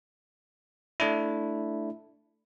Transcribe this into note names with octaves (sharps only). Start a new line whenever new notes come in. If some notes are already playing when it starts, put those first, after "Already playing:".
A3 D4 E4